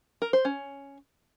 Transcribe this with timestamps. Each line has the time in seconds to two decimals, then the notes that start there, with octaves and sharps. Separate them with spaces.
0.22 A#4
0.33 C5
0.45 C#4